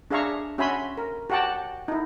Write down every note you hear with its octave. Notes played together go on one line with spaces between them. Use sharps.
D4 G#4 E5 F5 A#5 C#6
C#4 F#4 E5 G#5 B5 C6
A#4
F#4 G4 F#5 G5 A5
D#4 E4